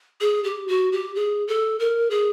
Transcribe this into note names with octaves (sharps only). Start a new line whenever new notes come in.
G#4
G4
F#4
G4
G#4
A4
A#4
G#4